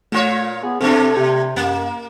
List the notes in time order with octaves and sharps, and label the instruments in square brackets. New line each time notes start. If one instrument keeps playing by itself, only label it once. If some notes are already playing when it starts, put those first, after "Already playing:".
[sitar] A#2 F4 C#5 [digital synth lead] A3
[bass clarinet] B3 [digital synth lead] G#4
[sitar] B2 A3 D4 [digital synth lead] C4 [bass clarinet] A4
[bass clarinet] C3 [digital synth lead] G4
[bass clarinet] F#2 [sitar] A#3